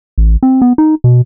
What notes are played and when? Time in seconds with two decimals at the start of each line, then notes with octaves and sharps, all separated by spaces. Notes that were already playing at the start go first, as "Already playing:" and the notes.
0.18 A1
0.43 C4
0.62 B3
0.78 D#4
1.04 B2